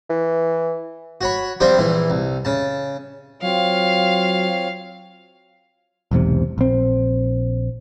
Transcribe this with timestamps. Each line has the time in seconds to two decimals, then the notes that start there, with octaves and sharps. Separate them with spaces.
0.10 E3
1.21 F#4 C#5 B5
1.60 F3 G3 C4 D4 G4
1.78 A#1 E3 E4
2.10 C2
2.45 C#3 A5
3.42 F#3 C4 F4 C#5 F5
6.11 B1 E2 G#2 C3
6.58 A#1 C4